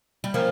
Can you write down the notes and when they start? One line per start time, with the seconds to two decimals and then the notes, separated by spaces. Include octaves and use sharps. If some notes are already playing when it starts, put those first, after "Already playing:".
0.24 G3
0.34 D#3 F3 A#3 C#4